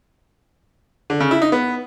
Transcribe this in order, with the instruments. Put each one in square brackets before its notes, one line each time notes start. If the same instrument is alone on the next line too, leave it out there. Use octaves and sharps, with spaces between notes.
[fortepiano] D3
C#3
E4
D#4
B3